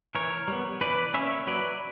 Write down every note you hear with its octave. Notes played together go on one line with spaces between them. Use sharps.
E3 A#4 C#5
G3 B3
E3 B4 D5
A#3 C#4 C#5 E5
F#3 B4 D5